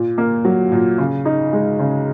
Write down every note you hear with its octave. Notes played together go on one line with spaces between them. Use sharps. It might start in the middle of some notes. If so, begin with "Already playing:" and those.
Already playing: A#2
A#3
F#3
A#2
C#3
D#4
G#3
C#3